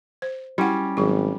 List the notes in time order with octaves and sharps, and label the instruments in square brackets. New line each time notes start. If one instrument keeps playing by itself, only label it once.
[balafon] C5
[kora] G3 C#4 [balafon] E4 F#5
[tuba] G#1 [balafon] F#3 G#4